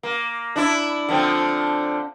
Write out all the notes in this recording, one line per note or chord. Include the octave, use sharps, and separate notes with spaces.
A#3
D4 E4
D3 F3 C4